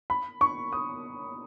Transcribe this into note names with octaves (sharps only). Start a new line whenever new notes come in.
B5
C#6
D#6